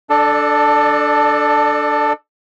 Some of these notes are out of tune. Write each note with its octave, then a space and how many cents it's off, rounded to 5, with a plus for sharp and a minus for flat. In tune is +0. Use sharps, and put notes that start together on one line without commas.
D4 +0 A4 +0 D5 +35